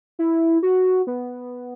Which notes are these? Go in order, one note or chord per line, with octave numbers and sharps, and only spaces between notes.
E4
F#4
B3